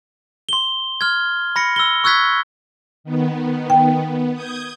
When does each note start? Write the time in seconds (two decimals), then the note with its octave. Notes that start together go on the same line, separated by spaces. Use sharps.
0.49 C6 G7
1.01 C6 F6 G#6
1.56 B5 A#6 C#7
1.76 E6 G7
2.04 C#6 E6 F#6 G#6 B6
3.04 D#3 B3
3.70 G5
4.03 B3
4.34 D#6 G6 G#6